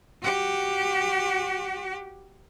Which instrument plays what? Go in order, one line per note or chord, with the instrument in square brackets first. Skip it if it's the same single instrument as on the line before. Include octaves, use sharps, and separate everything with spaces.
[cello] F#4 G4